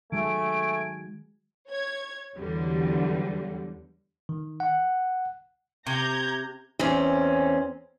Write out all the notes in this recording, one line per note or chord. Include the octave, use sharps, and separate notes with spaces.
D#3 F#3 G#3 A3 G#5 D7
C#5 G#6
E2 D3 E3 F#3 G3
D#3
F#5
C3 A#5 G6 G#6
E2 C4 C#4